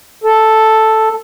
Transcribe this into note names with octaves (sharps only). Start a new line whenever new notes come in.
A4